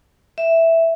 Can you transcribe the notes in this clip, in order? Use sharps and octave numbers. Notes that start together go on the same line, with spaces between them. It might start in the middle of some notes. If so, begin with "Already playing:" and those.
E5